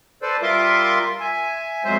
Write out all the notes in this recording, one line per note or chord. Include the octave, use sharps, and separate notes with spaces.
A4 B4 C5 D5
G3 F4 A#4 E5 C6 D6
E5 G#5
F2 G#2 F#3 G#3 C5 E5